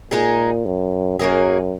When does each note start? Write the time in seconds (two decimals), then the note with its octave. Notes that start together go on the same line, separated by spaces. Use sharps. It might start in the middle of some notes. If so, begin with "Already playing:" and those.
0.11 A#2 G#3 D#4 G#4
0.66 F#2
1.19 F#2 F#3 A#3 D#4 G#4